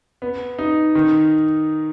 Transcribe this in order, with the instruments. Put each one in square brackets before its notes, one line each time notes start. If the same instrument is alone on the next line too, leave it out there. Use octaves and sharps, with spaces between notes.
[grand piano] B3
D#4
D#3